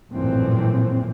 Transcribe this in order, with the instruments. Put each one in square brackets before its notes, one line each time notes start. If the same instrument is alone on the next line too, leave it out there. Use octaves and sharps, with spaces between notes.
[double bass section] A#1 F#2 A2 E3 C4